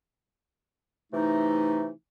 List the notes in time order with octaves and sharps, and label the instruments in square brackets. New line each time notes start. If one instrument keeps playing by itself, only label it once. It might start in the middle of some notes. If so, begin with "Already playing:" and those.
[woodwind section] C3 E3 A3 D#4